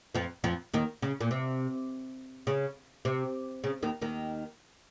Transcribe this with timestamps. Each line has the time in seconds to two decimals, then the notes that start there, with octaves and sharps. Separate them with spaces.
0.15 F2 F3
0.44 F2 F3
0.74 D#2 D#3
1.02 C#3
1.21 A#2
1.31 C3
2.47 C#3
3.05 C3
3.64 C#3
3.82 D#2 D#3
4.01 D#2 D#3